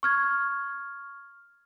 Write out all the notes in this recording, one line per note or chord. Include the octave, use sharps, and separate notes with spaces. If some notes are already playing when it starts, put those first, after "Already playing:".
C#6 F6 G#6